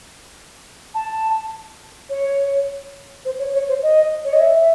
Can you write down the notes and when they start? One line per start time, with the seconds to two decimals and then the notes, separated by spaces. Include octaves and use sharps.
0.95 A5
2.10 C#5
3.25 C5
3.39 C#5
3.54 C#5
3.68 C5
3.83 D#5
4.25 C#5
4.33 D#5
4.40 E5